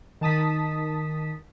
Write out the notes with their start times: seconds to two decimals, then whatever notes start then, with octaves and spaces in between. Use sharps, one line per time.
0.21 D#3 A5 D#6 B6